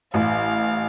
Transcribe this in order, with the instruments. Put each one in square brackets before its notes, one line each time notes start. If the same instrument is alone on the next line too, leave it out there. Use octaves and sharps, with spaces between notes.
[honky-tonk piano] A1 [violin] F5